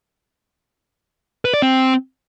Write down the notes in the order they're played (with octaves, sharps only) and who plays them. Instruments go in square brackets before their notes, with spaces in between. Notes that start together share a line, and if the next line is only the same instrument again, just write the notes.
[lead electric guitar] B4
D5
C4